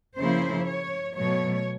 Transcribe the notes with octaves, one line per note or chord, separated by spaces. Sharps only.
C#3 F3 A#3 C#4 E4 C5
C#5
B2 F#3 A3 C#5